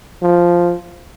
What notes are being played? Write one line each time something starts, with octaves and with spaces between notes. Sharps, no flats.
F3